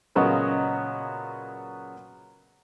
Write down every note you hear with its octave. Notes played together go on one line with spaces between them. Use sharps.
A#2 C#3 F#3 B3 F#4 D#5